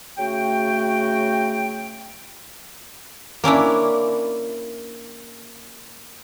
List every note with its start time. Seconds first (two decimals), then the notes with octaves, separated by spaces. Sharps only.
0.17 C#3 A3 F#4 G5
3.44 A#3 C#4 D4 E4